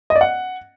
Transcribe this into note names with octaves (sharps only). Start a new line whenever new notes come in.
D#5
D5
F#5